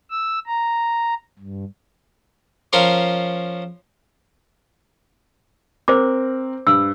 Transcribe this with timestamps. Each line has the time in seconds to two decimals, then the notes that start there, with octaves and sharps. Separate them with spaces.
0.10 E6
0.47 A#5
1.39 G2
2.73 F3 C#4 A#4 C6 C#6
5.88 C4 A#4 C5 D6
6.67 G2 E6